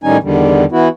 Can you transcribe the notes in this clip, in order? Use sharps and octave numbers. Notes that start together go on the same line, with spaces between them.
A2 D#3 G3 C#4 D#4 G#5
E2 D3 D#3 G3
E3 B3 E4 F#4